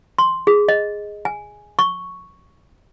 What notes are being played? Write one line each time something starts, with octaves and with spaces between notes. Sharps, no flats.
C6
G#4
D#5
G#5
C#6